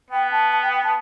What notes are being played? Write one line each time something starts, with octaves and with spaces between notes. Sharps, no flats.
B3 G5
A5
A5
G5
G5
A5